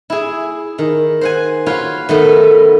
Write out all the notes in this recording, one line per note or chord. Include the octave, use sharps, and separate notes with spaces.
E4 G#4
D#3
C5 F#5 G#5
F4 F#4 B4 C#5 F5
D#3 A3 B3